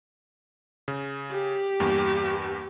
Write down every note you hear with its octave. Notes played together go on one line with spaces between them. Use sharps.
C#3
G4
E2 G2 A#3